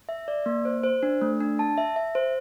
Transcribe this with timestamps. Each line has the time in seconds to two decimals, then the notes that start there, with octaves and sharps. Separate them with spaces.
0.09 E5
0.28 D5
0.46 A#3
0.65 C5
0.84 C5
1.03 D4
1.21 A3
1.40 D4
1.59 A5
1.78 E5
1.96 E5
2.15 C5